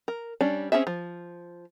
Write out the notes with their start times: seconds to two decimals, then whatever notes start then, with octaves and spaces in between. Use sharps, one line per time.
0.08 A#4
0.41 G3 C#4 D4
0.72 C4 C#4 F#4 G#4 E5
0.87 F3